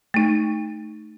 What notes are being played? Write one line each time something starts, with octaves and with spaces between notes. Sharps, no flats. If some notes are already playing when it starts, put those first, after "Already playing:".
A3 D#4